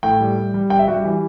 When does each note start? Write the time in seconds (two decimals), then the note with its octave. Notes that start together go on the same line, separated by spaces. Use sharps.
0.03 A2 G5
0.21 G3
0.36 G3
0.54 G3
0.70 G3 G5
0.79 E5
0.87 G3 F#4
0.96 G4
1.04 E3